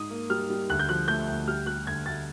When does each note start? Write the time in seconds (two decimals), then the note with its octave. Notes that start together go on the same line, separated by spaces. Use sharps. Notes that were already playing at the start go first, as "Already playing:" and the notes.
Already playing: G#2 D#6
0.11 A#3
0.30 G3 F6
0.50 G3
0.70 D2 F#6
0.79 G6
0.89 F3 F#6
1.08 A3 G6
1.28 D2
1.47 G3 F6
1.67 G3 F#6
1.87 D2 G#6
2.06 D2 A6